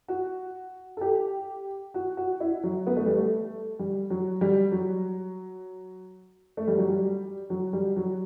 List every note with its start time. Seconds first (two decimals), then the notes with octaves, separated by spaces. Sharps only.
0.08 F#4
0.97 A4
1.01 G4
1.94 F#4
2.17 F#4
2.40 E4
2.64 F#3
2.87 B3
2.96 A3
3.06 G3
3.16 A3
3.79 G3
4.10 F#3
4.41 G3
4.72 F#3
6.57 A3
6.68 G3
6.78 F#3
6.89 G3
7.50 F#3
7.73 G3
7.96 F#3